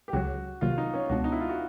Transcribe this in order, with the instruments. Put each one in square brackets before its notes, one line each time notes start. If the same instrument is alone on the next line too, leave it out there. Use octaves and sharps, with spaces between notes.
[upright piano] G4
[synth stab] C#2 C#3 F#3 [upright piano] F#4
[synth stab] C2 C3 D#3 F#3 A#3 [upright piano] F4
[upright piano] D#4
C#4
[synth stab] C#2 B2 G#3 B3 D4 [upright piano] F#4
[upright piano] D#4
E4
F4
F#4